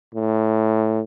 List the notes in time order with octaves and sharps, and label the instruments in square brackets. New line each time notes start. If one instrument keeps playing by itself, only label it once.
[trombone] A2